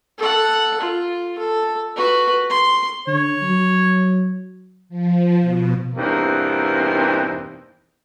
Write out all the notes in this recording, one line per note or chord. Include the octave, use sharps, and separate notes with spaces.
A4 F#5
F4
A4
F#4 B4
C6
D3 C#5
F#3
F3
B2
E2 G2 B2 A#3 C4 D#4